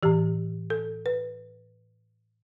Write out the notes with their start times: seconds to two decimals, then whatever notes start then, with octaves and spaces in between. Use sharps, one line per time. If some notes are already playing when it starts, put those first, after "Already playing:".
0.03 A2 E3 G4
0.70 A4
1.06 B4